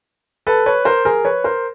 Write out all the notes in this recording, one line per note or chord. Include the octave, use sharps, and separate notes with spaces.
A4 B4
B4 C#5
A#4 C5
G#4 A#4
B4 C#5
A#4 C5